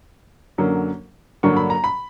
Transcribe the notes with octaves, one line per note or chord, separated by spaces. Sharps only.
F#2 D3 F#3 A#3
G2 D3 F#3 A#3 C#6
B5
A#5
B5